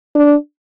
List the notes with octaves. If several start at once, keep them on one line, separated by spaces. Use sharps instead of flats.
D4